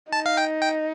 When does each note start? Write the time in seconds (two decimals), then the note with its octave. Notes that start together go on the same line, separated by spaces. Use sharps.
0.12 D#4 A5
0.26 F5
0.37 G5
0.62 G5